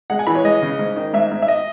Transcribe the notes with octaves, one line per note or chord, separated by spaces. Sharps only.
G#3 F#5
G#5
E3 B5
C#5
G#3 D#5
C#3
G#2
D#3
G#2 E5
G#2
E5
D#5